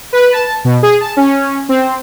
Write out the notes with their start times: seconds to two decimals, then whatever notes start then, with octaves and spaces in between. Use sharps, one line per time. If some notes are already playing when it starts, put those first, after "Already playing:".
0.13 B4
0.32 A5
0.65 B2
0.83 G#4
1.00 A5
1.17 C#4
1.69 C4